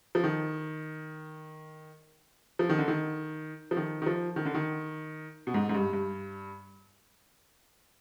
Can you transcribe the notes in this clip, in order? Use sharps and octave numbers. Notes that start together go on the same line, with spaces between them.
F3
D#3
F3
D#3
D3
D#3
F3
D#3
D#3
F3
D#3
D3
D#3
B2
G#2
G#2
G2
G2